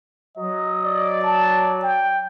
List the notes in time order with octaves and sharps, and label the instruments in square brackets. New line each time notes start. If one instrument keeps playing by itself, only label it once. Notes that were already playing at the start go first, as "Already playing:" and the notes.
[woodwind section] F#3 [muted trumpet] D#5
[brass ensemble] D5
[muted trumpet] A5
G5